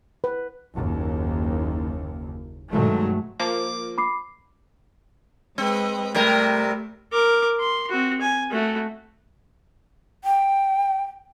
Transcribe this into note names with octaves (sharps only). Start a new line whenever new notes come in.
B4
F#1 D#2
G2 B2 D#3 F#3 G#3 A3
F3 A#3 D6
B5 D6 C7
G#3 C4 B4 D#5
C3 G3 A3 A#4
A#4 D6
C6
C4 F#4
G#5
A3 F#4
G5